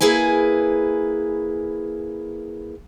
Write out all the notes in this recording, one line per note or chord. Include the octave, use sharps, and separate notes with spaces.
A#3 E4 G#4 B4 G#5